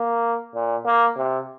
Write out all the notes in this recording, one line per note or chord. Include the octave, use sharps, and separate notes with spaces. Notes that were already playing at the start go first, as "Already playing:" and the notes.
Already playing: A#3
A#2
A#3
C3